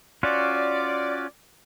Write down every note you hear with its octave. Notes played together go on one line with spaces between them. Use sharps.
C#4 F4 F#4 D5